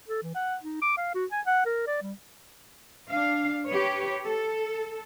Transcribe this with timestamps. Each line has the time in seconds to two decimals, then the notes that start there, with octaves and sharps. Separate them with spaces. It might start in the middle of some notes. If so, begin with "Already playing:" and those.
0.08 A4
0.23 E3
0.35 F#5
0.63 D#4
0.82 D6
0.98 F5
1.15 F#4
1.32 G#5
1.46 F#5
1.66 A#4
1.87 D5
2.02 G3
3.11 D4 F5
3.67 G4 B4 C#5
4.25 A4